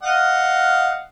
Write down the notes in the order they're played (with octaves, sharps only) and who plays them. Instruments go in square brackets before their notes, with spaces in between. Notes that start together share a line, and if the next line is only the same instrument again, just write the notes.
[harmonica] D#5 F5 F#5